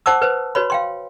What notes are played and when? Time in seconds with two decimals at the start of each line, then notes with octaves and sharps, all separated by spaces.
0.06 C5 F#5 A5 D6 E6
0.22 B4 C5
0.55 F#4 B4 C#5 B5
0.70 F5 G5 C6